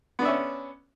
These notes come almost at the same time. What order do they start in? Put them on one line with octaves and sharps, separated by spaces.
B3 D4 E5 C#4